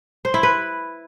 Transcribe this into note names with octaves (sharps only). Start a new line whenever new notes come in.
C5
E4
B4